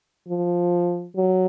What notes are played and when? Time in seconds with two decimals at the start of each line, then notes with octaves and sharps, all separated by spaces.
0.28 F3
1.16 F#3